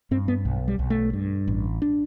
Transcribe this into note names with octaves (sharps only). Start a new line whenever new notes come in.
G2 C4
B3
B1
G3
B1
A3
G2
A1
D4